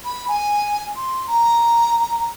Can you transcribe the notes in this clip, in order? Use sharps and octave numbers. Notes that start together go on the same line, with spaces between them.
B5
G#5
C6
A#5